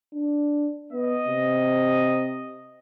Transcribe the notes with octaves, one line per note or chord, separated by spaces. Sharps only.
D4
B3 D#5
C3